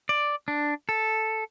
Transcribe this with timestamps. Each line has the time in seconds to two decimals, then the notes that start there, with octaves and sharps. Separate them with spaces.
0.09 D5
0.48 D4
0.89 A4